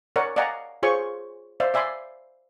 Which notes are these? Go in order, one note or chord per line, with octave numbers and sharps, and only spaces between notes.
A#4 C#5 D5 F#5
D5 D#5 F5 F#5 G#5 A#5
F4 G#4 C5 C#5 G#5 C#6
C5 D5 E5 F5
D5 E5 G#5 B5 C6